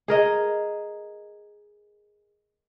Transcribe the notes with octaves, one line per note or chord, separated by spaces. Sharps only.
G#4 A#4 D#5